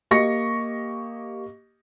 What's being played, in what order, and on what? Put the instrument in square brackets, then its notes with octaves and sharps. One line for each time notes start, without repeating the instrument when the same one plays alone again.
[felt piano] A#3 G4 D#5 C#6 A#6 C#7